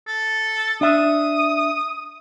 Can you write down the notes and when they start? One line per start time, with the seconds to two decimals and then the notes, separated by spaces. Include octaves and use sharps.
0.08 A4
0.81 D4 E5 D#6